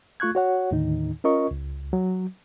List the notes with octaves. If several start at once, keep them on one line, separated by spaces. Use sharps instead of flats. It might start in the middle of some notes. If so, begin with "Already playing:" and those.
A3 F4 C#6 F#6 G#6
F#4 C#5 F#5
D#2 A2 D3 D#3 D#4
C#4 F4 A#4 D#5 C#6
C#2
F#3